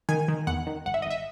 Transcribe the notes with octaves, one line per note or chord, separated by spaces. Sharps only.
D#3 G#5
D#3
E2 F#5
D#3
G#1 F#5
E5
G#1 D#5
E5